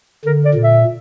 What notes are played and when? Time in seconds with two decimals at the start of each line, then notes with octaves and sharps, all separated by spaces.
0.25 D3 A#4
0.45 D5
0.54 A#2
0.64 E5